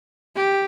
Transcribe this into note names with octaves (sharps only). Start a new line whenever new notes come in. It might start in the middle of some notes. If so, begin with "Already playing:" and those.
G4